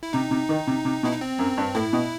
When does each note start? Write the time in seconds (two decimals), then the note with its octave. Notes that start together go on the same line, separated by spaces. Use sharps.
0.03 E4
0.13 C3 D#4
0.31 C3
0.49 D#3
0.67 C3
0.85 C3
1.03 B2 E4
1.12 D#4
1.21 C4
1.39 F#2
1.57 G2
1.75 A2 E4
1.93 B2